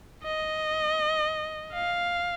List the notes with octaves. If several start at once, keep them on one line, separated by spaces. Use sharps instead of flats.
D#5
F5